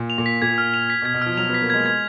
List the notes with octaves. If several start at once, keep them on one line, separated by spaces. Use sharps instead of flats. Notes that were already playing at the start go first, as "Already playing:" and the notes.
Already playing: A#2
F7
A#2
B6
A#2 G#6
F6
F7
B6
B2
G#6
B2
F3 F6
F#3 F7
B3
B6
A#3
G#3 G#6
G#6